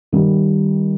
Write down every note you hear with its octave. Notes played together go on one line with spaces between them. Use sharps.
D#3 G3